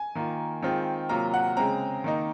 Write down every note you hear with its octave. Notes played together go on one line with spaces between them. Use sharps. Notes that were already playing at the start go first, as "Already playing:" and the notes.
Already playing: G#5
D#3 A#3 F4
D#3 G#3 C4 F4
C3 F#3 A#3 F4 A#5
F#5
C#3 G#3 C4 A#5
D#3 A#3 D#4